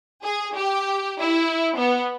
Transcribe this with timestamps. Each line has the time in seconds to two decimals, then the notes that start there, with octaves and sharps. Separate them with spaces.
0.23 G#4
0.54 G4
1.20 E4
1.78 B3